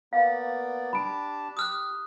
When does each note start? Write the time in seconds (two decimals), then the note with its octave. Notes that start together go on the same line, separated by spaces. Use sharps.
0.13 A#3 B3 D5 F5
0.93 D4 G4 A5 B5 D7
1.57 G4 D#6 F6 F#6